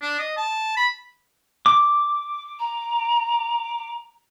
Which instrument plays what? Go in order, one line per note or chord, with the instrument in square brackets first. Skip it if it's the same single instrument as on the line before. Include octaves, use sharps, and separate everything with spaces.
[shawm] D4
D#5
A5
B5
[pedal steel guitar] D6
[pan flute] A#5